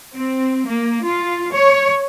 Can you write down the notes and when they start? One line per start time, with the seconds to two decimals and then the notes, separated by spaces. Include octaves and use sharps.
0.14 C4
0.66 A#3
1.04 F4
1.51 C#5